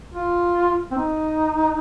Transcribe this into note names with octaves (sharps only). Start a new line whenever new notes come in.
F4
C4
D#4